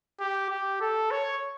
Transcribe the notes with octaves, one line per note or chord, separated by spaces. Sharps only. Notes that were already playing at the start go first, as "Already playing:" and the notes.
G4
G4
A4
C#5